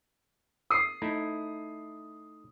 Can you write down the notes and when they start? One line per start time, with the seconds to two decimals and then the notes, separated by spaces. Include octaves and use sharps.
0.70 D#6 C7
1.02 A3 D#4 E4